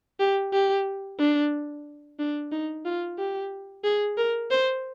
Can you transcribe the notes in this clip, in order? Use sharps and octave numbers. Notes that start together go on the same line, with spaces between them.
G4
G4
D4
D4
D#4
F4
G4
G#4
A#4
C5